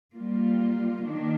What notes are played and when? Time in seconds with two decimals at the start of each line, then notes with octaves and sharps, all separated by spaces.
0.14 G3 A#3 F4
1.05 D#3 A#3 D4